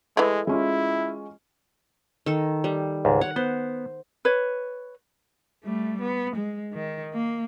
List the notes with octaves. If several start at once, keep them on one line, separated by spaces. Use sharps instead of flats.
E3 G#3 A3
G#3 C#4 E4 F4
D#3 A4
G3
C#2 G#2
C#5 F#5
B3 C5
B4 C#5
G3 A3
B3
G#3
D#3
A#3